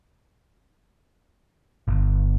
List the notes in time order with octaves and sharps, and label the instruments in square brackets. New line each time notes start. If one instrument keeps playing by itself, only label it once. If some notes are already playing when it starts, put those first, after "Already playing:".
[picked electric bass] G1